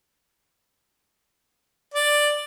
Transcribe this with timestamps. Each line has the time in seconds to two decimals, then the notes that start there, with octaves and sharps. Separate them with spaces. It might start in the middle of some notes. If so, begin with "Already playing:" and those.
1.94 D5